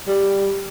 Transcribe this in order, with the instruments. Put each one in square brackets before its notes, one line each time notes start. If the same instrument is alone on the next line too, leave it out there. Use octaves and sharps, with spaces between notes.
[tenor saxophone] G3